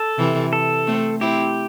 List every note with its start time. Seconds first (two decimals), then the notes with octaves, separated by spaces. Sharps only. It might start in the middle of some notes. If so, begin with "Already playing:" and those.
Already playing: A4
0.18 C3 E3
0.53 A4
0.87 A3 C4
1.21 C4 E4 G4